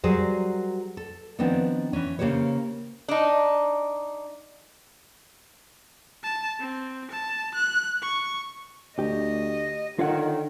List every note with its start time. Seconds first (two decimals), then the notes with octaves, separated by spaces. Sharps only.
0.04 F#3 G3 G#4 A#4 C5
0.97 A4
1.39 D#3 F3 B3 C4 D4 D#4
1.93 E3 C#4
2.19 C#3 A#3 G4 C5 C#5
3.08 D4 D#4
6.23 A5
6.60 C4
7.11 A5
7.55 F#6
8.03 C#6
8.99 D2 G4 D#5
9.99 D3 D#3 F4 C#5 F#5